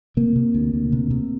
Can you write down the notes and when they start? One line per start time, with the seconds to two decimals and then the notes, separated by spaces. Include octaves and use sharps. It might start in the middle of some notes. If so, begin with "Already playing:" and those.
0.17 C3 A#3
0.36 C3
0.54 D2
0.74 D2
0.92 C3
1.11 C3